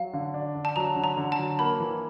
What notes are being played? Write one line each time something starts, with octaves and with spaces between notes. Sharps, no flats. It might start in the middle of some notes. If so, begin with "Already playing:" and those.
Already playing: F#3 F5
D3
D4
D3
A5
F#3 A#5
D3
A#5
D3
A5
F#3
A#3 B5
E3